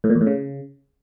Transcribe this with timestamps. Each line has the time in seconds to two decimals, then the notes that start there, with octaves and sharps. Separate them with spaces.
0.04 A2
0.10 A#2
0.15 E2
0.21 A2
0.27 C#3